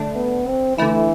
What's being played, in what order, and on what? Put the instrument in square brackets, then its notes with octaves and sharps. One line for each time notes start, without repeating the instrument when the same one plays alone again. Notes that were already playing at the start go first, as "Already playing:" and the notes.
Already playing: [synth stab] D3 A3 D4
[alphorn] B3
C4
[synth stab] D3 A3 E4 [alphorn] E3